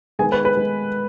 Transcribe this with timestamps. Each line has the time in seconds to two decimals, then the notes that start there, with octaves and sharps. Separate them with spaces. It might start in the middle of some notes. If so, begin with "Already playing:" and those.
0.19 D#3 G#3 B3 G#4 G#5
0.32 B4
0.45 B4
0.57 D#3 G#3 B3